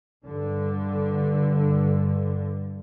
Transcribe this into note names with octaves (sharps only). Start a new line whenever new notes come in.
G2 D3